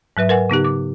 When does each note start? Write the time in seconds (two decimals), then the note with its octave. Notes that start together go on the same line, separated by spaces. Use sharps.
0.17 G#2 F#3 B4 E5
0.29 A#4 B4 F#5 G#5
0.50 C#3 B3 D#4 G4
0.64 D6